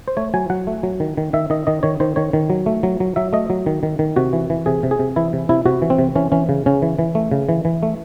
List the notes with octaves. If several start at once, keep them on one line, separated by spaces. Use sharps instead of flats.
C5
A3 C#5
F#3 G#5
F#3 F#5
A3
F#3
D#3
D#3
D#3 E5
D#3 D#5
D#3 D#5
D#3 C#5
D#3 C5
D#3 C#5
D#3
F#3
A3
F#3
F#3
F#3 E5
A3 D#5
F#3
D#3
D#3
D#3
C3 F#4
E3
E3
C3 G#4
C3
G#4
C3
E3 E4
C3
C3 E4
C3 F#4
E3
C4
C3
E3 C#4
E3 C#4
C#3
C#3 C#4
E3
E3
A3
C#3
E3
E3
A3